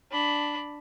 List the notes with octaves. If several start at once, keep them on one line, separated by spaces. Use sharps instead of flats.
D4 B5